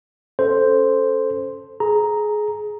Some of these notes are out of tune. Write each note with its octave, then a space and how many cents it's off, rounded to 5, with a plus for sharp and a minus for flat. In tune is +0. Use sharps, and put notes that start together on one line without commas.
C#4 +10 A4 +0 C5 +0
G#4 +20 A#5 +0